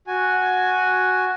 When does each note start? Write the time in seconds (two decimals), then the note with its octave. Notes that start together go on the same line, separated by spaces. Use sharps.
0.07 F#4 G#5